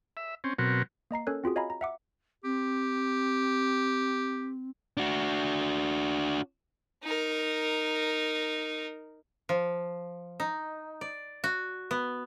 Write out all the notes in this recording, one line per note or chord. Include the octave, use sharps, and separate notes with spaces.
E5
C4 C#4
B2 F#3 C4 F#4 A#4
A#3 D#5 A#5 C7
C#4 A4 A#4 C#5 F#6
C4 F4 F#4 G#4
C#5 D#5 F5 G#5 A#5 B5
A#5
E5 F#5 D6
C4 G4
D4 F#4
D#4 A#4
F3
D#4
D5
F#4
B3